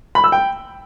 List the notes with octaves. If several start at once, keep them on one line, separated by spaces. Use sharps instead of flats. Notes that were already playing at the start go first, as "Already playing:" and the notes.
B5
E6
G5